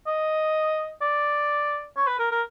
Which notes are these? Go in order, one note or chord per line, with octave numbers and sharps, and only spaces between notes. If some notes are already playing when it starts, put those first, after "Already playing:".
D#5
D5
C#5
B4
A#4
A#4